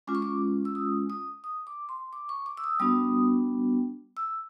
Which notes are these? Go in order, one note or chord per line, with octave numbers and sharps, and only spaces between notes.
G#3 C#4 F4 D6
C#6
D6
E6
D#6
D#6
D#6
D6
C6
D6
C#6
D6
E6
D#6
G3 B3 D4 F#4 D#6
E6